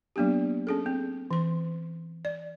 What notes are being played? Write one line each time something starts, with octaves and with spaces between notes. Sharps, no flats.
F#3 A#3 B3 D4 G4
C#4 G#4 A4
C4
E3 C6
D5